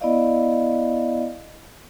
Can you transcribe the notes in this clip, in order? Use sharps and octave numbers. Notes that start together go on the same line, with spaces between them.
B3 E4 D5 D#5 F5